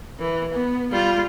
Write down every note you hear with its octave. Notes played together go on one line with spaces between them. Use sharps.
E3
B3
G3 F4